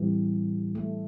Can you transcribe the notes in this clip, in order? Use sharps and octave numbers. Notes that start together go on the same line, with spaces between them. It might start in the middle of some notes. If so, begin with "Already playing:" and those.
Already playing: A2 E3 G3 C4
A3